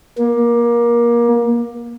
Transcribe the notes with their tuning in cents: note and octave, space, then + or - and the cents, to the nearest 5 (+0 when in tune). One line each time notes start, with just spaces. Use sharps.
A#3 +25